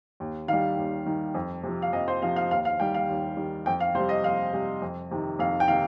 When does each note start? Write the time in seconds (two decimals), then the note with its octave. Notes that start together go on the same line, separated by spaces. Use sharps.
0.20 D#2
0.48 D#3 G3 F5
0.77 D#2
1.06 D#3 G3
1.35 F2
1.63 C3
1.69 F3
1.82 F5
1.93 F2 D#5
2.08 C5
2.22 C3 F3 F5
2.36 F5
2.51 D#2 F5
2.65 F5
2.80 D#3 G3 G5
2.94 F5
3.09 D#2
3.37 D#3 G3
3.66 F2 G5
3.80 F5
3.94 C3 C5
4.00 G3
4.09 D#5
4.23 F2 F5
4.53 C3 G3
4.82 F2
5.11 C3 D#3
5.39 F2 F5
5.60 G5
5.68 C3 D#3 F5